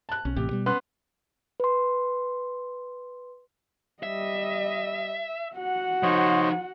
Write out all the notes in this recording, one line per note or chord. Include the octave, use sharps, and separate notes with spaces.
A5 F#6
B1 C#4
A1 A2 C3 G4
B2 G3
B3 C#4 C6 F#6
B4 C6
G3 D#5 E5
F#4 F#5
F3 D#4 C5 C#5 D#5